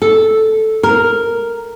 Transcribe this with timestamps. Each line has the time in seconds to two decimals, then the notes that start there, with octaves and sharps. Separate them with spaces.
0.02 A4
0.83 A#4